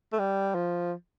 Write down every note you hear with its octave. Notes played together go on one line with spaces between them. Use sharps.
A3
G3
F3